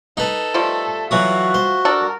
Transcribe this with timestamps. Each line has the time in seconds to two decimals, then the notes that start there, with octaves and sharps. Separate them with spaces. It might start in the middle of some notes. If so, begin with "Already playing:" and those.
0.17 D#4 A4 B4
0.54 F3 G3 A3
1.11 E3 F#3 F4 F#4 D#6
1.54 C5
1.85 D4 A4 A#4